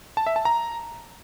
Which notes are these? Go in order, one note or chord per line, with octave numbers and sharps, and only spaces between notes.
A5
E5
A5
A#5